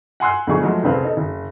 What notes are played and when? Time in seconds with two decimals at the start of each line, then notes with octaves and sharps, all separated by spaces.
0.20 F#5 G#5 C6 E6 F#6
0.47 D2 B2 F3 F#3 G#4 C#6
0.62 F3 F#3 G#3 A3 F#4
0.83 F1 A#1 C#3 C4 B4 F5
1.05 D#4 A4
1.17 F#1